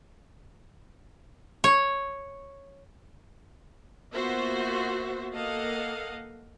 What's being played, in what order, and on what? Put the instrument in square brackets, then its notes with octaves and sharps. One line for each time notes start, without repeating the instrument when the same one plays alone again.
[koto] C#5
[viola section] A#3 B3 F4 F#4 C5 E5
A#3 A4 D#5 F5 F#5